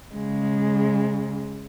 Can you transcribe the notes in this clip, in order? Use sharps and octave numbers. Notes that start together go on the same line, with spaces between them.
C#3 G#3